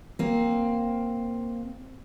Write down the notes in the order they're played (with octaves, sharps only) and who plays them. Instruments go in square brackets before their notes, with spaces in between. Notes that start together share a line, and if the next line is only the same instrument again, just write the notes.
[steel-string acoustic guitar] A#3 C4